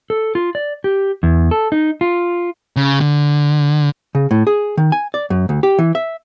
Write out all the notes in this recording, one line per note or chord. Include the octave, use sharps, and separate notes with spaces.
A4
F4
D5
G4
E2
A4
D#4
F4
C#3
D3
C#3
A2
G#4
D#3
G#5
D5
F#2
D2
G4
E3
E5